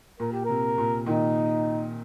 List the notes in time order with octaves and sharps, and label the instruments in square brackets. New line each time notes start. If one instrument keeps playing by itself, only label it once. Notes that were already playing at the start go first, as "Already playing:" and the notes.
[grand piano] A#2 [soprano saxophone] A#4
[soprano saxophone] G4
[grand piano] C3 [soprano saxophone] A#4
[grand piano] A#2
[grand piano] A#2 D#3 [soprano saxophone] D#4